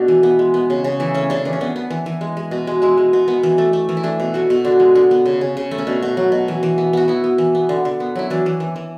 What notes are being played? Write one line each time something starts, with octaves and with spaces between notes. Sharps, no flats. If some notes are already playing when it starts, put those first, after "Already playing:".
Already playing: B2 A3 D4 A4
E3
B3
G#3
B3
C#3
C#3
E3 E4
A3 C#4
C#3 D4
E3 D4
C#4
B3 D4
B3
E3
E3
G#3
G#3
B2
G#3
G#3 E4
G#3
B2
B3
E3
A3
A3
E3
E4
A3 D4
B2
A3 F#4
B2
D3 D4
G#3
D3
B3
C#3
C#3
C#3
A3
C#4
B2 D4
B2
F#3
B2
E3
E3
B3
B3 F#4
B3 E4
B3
E3
B3
D3
D3
B3
F#3 E4
E3 D4
E3
E3
E3